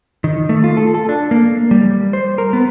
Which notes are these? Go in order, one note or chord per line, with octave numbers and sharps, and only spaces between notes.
D#3
A3
F4
A4
A4
D4
A#3
G3
C5
A#4
B3